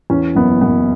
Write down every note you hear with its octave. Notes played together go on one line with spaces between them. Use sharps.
E2 C#4
F#1 B3
F#1 B3